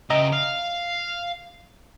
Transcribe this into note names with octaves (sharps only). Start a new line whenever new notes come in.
C#3 D#5 E5 G5 A#5
F5